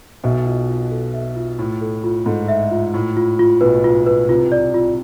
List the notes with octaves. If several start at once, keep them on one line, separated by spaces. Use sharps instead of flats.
B1 B2 E5
F4
F4
A4
E5
F4
A2 F4
A4
F4
G#2 A4
E5
F4
A2 F4
F4
F4
B1 B2 B4
F4
B4
C2 C3 F4
D5
F4